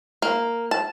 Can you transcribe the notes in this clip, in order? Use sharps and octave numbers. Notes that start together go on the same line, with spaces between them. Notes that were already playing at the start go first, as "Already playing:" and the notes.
A#3
A5